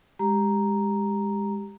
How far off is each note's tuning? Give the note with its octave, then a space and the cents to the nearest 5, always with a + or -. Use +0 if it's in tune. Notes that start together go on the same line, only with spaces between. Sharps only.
G#3 -20 G4 +0 A#5 +0